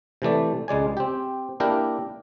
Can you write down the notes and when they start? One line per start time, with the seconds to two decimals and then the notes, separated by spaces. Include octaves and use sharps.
0.22 C3 E3 A3 D5
0.68 C#2 G#3 D5 G#5
0.97 C4 G4
1.60 A#3 D4 E4 G4 A#4 G5